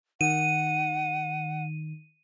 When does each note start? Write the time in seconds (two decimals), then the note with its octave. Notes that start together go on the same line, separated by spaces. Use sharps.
0.21 D#3 F#5 D#7